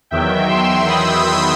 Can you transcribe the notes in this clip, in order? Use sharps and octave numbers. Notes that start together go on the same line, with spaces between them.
E2 D#3 F#3 E5 G5
C6 E6
B5 D#6